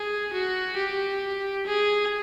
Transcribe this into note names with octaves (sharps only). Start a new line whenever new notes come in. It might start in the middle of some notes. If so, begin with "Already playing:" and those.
Already playing: G#4
F#4
G4
G#4